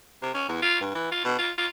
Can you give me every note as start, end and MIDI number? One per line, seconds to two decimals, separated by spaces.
0.22 0.33 48
0.34 0.48 61
0.48 0.60 40
0.62 0.79 65
0.80 0.94 43
0.94 1.10 52
1.11 1.23 65
1.24 1.36 47
1.38 1.50 65
1.58 1.66 65